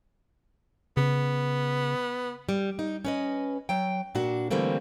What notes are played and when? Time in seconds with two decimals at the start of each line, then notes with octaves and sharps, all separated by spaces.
0.97 C#3 B3
2.49 G3
2.79 D#4
3.05 C#4 B4 D#5
3.69 F#3 G5
4.15 A#2 D4 F#4
4.51 D3 E3 G3 A3 A#3 C4